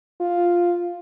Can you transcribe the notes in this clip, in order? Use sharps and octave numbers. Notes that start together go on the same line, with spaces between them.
F4